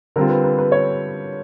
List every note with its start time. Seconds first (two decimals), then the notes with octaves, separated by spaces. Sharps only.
0.16 D3 G3 C4 F4 A#4
0.30 B4
0.44 B4
0.58 B4
0.72 C#5